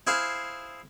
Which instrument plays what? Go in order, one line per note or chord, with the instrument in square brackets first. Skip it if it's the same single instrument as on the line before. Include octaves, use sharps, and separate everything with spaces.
[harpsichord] E4 G#4 C5 F5